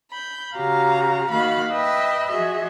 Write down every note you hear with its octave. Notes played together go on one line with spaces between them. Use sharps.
B5 G6
C#3 F#4 G4 F5 A#5
D#3 A#3 F#4 F5 B5 F#6
B4 D#5 E5 G5 B5 E6
F3 F#4 G#4 D#5 E5